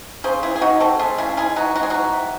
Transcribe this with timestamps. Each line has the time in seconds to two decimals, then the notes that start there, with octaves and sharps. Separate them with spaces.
0.24 C#3 G#4 C5
0.43 E3 E4 G#4
0.56 G#4
0.61 E3 D#4 F#4
0.80 C4 F#4 A4
0.99 A3 G#4 C5
1.18 C#3 E4 G#4
1.37 G#3 E4 G#4
1.56 E3 D#4 F#4
1.76 G#3 F#4
1.83 G#4
1.90 E3 D#4 F#4
2.13 C3